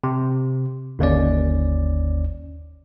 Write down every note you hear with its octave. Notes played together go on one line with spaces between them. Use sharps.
C3
G1 D#2 C#4 D5